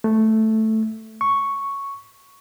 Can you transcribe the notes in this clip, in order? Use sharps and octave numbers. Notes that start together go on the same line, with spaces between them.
A3
C#6